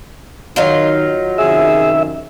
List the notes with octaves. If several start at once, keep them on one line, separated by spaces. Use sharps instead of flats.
D#3 F#3 D#4 F4
F#2 C3 D#3 G#4 E5